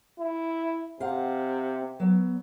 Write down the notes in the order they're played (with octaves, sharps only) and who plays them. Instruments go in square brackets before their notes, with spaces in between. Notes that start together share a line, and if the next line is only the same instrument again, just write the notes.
[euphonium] E4
[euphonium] C3 [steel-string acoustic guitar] C4 F5 F#5
[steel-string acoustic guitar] F#3 B3